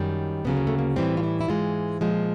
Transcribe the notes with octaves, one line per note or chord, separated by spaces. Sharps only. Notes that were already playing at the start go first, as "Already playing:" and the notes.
Already playing: F#2 D#3 G3
D2 C#3 F#3 B3
A#3
A3
A#3
A2 E3 G3 C4
F4
E4
E4
G#2 E3 G#3 F4
A#2 F3 G#3